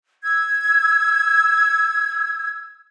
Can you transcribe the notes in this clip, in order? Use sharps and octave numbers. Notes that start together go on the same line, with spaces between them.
E6 G#6